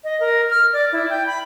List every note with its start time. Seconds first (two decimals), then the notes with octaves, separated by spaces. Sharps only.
0.04 D#5
0.20 A#4
0.50 F6
0.73 D5
0.92 E4
1.10 G5
1.27 B5